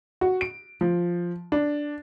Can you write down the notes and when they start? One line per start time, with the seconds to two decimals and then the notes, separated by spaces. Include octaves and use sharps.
0.21 F#4
0.41 D7
0.81 F3
1.52 D4